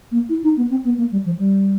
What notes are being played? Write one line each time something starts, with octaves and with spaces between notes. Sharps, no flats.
A#3
E4
D#4
B3
C4
B3
A#3
G3
F3
G3